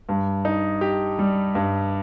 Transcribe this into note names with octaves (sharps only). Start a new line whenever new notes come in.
G2
D#4
G4
G3
G2